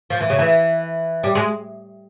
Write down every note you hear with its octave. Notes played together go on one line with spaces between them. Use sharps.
F3
E3
C#3
E3
G3
G#3